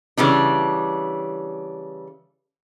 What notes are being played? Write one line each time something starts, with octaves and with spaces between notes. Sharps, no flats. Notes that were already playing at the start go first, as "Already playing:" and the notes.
C#3 E3 G3 D4